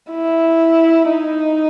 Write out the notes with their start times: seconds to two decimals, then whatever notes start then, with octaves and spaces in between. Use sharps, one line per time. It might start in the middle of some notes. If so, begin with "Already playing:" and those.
0.12 E4
1.11 D#4